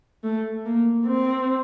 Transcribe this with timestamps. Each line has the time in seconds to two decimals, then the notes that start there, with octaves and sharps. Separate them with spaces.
0.23 A3
0.65 A#3
1.06 C4